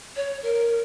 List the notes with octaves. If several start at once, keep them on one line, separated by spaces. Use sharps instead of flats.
C#5
A#4